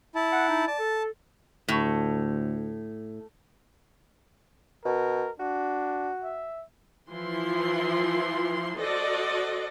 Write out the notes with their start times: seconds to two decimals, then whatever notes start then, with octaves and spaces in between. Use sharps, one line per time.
0.15 E4 A5
0.32 F#5
0.49 D#4
0.67 D5 A5
0.79 A4
1.68 D2 A2
4.85 B2 A#4
5.40 D4 F#4
6.23 E5
7.10 E3 F3 E4 C6
8.79 F#4 A4 C5 D5 D#5